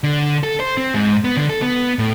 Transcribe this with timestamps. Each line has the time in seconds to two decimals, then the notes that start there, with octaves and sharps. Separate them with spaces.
0.04 D3
0.43 A4
0.60 C5
0.77 C4
0.94 G#2
1.24 B3
1.37 D3
1.49 A4
1.62 B3
1.99 A2